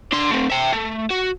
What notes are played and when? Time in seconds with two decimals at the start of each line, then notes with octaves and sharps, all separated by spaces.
0.13 D4 C6
0.31 A3 C4
0.50 E5 G5
0.73 A3
1.10 F#4